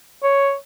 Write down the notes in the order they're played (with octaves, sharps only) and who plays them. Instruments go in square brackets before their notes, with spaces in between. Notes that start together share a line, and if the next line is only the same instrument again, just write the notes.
[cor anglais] C#5